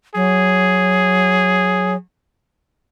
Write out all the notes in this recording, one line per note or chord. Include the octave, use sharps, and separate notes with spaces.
F#3 G#4